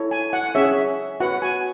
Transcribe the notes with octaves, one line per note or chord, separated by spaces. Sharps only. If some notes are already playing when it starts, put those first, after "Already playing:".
Already playing: E4 A4 C#5
G#5
F#5
C#4 G#4 C#5 E5
F#4 B4 F#5
G#5